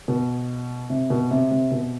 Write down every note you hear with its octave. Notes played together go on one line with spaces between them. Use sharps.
B2
C3
B2
C3
C3
B2